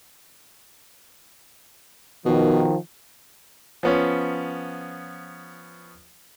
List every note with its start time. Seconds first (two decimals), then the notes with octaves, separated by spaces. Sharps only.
2.25 B2 D#3 F3
3.83 F3 B3 C#4